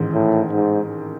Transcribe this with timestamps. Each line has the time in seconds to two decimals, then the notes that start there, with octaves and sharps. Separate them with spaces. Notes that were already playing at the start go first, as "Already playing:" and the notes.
Already playing: A1 G#2 D#3
0.14 A2
0.53 G#2